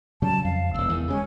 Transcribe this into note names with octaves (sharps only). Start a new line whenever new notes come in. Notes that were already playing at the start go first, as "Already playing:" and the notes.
C#3 F#3 G3 A5
F2 F5
E1 A#1 E6
E2 D#3
C#3 F#3 G#3 C#4